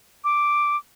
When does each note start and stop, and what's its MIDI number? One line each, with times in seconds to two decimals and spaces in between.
0.24 0.77 86